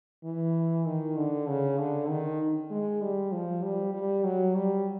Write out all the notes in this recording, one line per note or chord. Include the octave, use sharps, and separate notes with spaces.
E3
D#3
D3
C#3
D3
D#3
G#3
G3
F3
G3
G3
F#3
G3